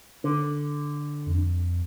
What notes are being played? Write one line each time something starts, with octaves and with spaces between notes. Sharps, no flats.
D3
F2